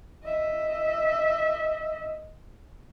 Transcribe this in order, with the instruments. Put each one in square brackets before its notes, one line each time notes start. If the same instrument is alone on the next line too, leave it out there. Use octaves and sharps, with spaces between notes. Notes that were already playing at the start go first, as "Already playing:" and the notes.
[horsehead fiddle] D#5 E5